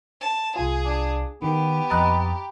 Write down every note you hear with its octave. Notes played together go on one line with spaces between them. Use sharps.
A5
C2 F4 G#4 G#5
D4
D#3 B3 G4
F2 D#5 A#5 B5 F#6 A6